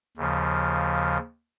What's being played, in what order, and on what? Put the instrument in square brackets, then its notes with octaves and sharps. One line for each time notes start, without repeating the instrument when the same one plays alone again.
[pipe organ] D#2 C#3 F3